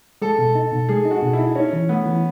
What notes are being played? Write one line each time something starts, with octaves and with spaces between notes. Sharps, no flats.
G#3 A4
B2
D#4
B2
G#3 G#4
D#4
F#4
B2
E4
D#4
C#4 D#4
E3
A3 B3
E3